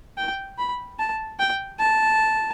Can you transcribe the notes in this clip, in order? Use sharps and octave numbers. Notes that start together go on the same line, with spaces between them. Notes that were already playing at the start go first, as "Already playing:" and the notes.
G5
B5
A5
G5
A5